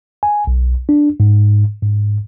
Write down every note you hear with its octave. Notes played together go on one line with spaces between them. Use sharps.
G#5
B1
D4
G#2
G#2